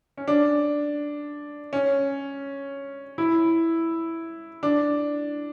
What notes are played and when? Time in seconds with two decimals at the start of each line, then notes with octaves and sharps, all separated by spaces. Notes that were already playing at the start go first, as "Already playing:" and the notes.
0.17 C#4
0.28 D4
1.73 C#4
3.18 E4
4.63 D4